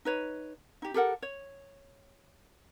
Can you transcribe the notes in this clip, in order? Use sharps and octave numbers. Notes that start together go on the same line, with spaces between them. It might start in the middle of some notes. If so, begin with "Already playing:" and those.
D#4 B4 C#5
D#4 G4
G4 A4 A#4 F#5
C#5